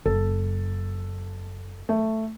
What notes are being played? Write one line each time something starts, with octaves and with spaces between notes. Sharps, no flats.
F#1 A4
A3